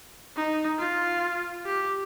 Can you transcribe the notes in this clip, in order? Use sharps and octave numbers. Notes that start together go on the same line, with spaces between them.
D#4
F4
G4